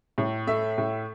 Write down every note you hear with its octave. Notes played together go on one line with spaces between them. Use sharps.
A2
A3 E5
A2